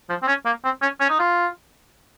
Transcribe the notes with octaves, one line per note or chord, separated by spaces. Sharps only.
F3
C4
C#4
A#3
C4
C#4
C#4
D#4
F4